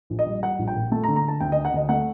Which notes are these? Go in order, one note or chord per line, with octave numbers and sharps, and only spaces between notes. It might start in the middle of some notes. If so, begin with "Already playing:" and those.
A#1
D#5
G3
G3 F#5
A#1
G5
A#2
A3 A5
A#5
D3
A#5
D3 A5
D2 G5
D#5
D3
F#5
D2 D#5
A3 F#5